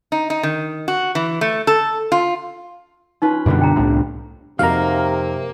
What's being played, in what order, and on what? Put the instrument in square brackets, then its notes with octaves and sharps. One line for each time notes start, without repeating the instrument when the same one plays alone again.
[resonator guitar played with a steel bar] D#4
D#4
D#3
F#4
E3
A3
A4
F4
[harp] C#4 F4 B4 [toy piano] D#4
[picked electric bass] F#2 B2 D3 [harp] G3 B3 D4
[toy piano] G5 A#5
[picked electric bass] C2 A2
[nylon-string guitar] F2 D#4 F#4 [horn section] C3 [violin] A#3 [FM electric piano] F5 A#5